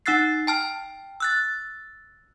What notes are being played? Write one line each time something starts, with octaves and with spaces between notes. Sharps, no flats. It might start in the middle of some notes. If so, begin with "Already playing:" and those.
D#4 F#5 E6 F#6 A6 C7
G5 A5 F6
E6 F#6 A6